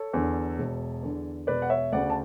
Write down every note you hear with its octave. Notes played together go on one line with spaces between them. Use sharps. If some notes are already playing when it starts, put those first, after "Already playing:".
Already playing: A4 C#5
E2 D3
E1
E2 D3
E1 B4 D5
F#5
C#5 E5
D2 C#3 D5 F#5
A5